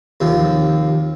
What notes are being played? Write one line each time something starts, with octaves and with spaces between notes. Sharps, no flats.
D#2 C3 F3